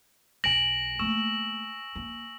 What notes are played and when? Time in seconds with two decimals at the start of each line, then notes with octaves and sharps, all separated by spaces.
0.44 B1 E2 G#5 A#6 D7 E7 F#7
0.99 A3 A#3 C#6 E6 E7
1.96 A#3